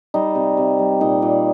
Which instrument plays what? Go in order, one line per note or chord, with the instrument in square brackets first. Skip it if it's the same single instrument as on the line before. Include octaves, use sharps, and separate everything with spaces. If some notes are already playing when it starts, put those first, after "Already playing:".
[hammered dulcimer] G3 D#4
C3
C3
G3
A#2 D#4
A#2